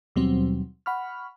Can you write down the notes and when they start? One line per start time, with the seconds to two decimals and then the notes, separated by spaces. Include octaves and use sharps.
0.16 D#2 B2 F#3 G3 C4
0.86 F#5 B5 C#6 F6